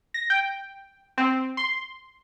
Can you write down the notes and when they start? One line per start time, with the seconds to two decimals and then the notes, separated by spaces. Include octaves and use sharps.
0.14 A#6
0.30 G5
1.18 C4
1.57 C6